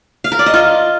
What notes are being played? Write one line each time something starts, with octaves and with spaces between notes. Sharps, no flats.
F5
A#4
D5
D#5
F4